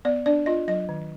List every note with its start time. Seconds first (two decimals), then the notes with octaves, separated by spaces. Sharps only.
0.05 B3 D5
0.26 D4 D5
0.46 F4 D#5
0.68 F#3 D#5
0.89 D#3